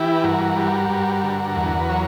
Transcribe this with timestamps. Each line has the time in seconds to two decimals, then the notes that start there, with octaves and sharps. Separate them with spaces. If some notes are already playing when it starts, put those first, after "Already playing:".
Already playing: E3 E4 G4
0.12 B4
0.24 G2 F#4 A#4
0.57 G3
0.90 G2
1.23 D3
1.56 E2
1.80 B4
1.89 F#3 A#4 C#5